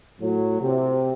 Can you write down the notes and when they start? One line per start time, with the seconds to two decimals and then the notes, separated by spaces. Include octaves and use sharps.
0.20 A2 F#3
0.60 C3